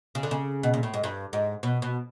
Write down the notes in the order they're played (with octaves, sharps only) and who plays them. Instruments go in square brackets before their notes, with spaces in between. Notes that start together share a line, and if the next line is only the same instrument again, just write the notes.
[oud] C#3
D3
C#3
B2
A#2
A2
G#2
G2
G#2
B2
B2